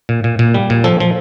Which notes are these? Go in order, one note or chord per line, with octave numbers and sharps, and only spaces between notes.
A#2
A#2
A#2
G3
A#2
F3 A4
F3